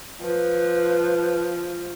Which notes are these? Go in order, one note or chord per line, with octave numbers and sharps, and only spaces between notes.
F3 B4